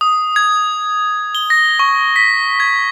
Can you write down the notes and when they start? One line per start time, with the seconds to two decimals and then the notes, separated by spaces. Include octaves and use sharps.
0.01 D#6
0.36 G#6
1.35 G7
1.50 A#6
1.79 C#6
2.16 B6
2.60 G#6